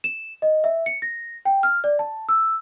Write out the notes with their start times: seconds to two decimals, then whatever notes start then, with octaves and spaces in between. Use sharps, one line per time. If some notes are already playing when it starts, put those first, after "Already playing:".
0.04 E7
0.42 D#5
0.64 E5
0.86 C#7
1.02 A#6
1.45 G5
1.63 F6
1.84 D5
1.99 A5
2.29 E6